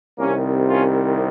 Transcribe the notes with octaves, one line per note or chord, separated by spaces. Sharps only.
C2 C3 D#3 A#3 C#4
C#4 F4